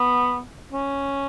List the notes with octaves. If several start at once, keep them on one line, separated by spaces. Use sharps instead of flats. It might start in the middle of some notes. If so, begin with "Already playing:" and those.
Already playing: B3
C#4